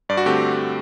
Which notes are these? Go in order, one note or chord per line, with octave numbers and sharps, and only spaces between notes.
G2 D5
F#4
D3 A3 C4 G4